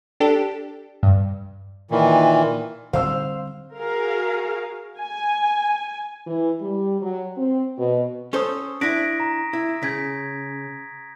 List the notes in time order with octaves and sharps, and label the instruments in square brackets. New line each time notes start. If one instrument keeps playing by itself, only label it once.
[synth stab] D4 G4 A4
G2
[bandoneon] A#2 D#3 E3
[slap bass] D3 G3 C4 [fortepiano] C5 E6 [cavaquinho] F5 C6
[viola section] F#4 G#4 A#4 F5
G#5
[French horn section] E3
G3
F#3
C4
B2
[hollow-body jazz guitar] C#4 A4 C5 [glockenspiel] C#6 D#6
[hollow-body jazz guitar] D4 E4 [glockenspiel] A#6 B6 D7
[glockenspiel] A#5
[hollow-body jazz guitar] E4
[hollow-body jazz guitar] C#3 [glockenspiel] G6 G#6 B6